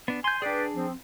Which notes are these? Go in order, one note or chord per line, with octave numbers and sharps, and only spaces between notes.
B3 D4
G#5 C6 G6
D4 G#4 B4 D5 G5
F3 C4